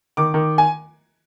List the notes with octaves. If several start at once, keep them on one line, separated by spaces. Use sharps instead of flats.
D#3 D6
D#3
G#5